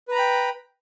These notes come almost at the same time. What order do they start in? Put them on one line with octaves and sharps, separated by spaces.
B4 A#5 B5 G5